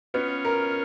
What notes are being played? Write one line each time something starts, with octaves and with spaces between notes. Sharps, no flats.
B3 C#4 F4
A#4